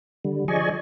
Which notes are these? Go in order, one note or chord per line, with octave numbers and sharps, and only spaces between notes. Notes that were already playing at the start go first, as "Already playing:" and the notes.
D3 G3
F3 G#4 D5 D#5 G#5 C#6